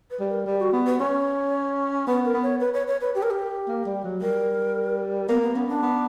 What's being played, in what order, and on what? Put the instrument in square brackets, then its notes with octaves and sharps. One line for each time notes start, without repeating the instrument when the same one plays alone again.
[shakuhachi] B4
[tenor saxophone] G3
[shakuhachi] A#4
[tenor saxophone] G3 [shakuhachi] G4
[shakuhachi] F#4
[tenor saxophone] B3
[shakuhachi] B4
[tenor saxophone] C#4 [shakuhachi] C#5
[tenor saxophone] B3 [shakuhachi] B4
[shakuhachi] A#4
[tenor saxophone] B3
[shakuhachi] C#5
B4
C#5
C#5
B4
G4
A#4
G4
[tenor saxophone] A#3
G3
F#3
[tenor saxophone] G3 [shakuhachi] A#4
[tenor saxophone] A#3 [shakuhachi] B3
[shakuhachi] B3
[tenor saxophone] B3 [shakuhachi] C#4
[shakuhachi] D4
[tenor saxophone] B3